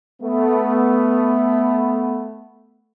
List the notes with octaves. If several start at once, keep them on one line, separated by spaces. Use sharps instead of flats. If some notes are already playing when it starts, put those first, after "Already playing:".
A3 B3